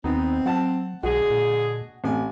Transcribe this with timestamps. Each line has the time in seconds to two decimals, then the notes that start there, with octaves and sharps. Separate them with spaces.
0.04 D#2 B3 C4 D#4
0.46 F#3 F#5 A5
1.03 B1 D3 G#3 F#4 G#4
1.30 A#2
2.04 A1 C4 G#5